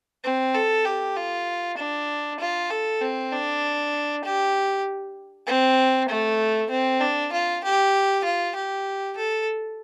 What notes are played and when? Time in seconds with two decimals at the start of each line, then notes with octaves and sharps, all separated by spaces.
0.24 C4
0.55 A4
0.85 G4
1.16 F4
1.77 D4
2.39 F4
2.70 A4
3.01 C4
3.32 D4
4.24 G4
5.47 C4
6.09 A3
6.70 C4
7.01 D4
7.32 F4
7.63 G4
8.24 F4
8.55 G4
9.17 A4